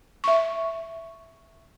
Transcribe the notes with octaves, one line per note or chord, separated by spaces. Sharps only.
E5 C#6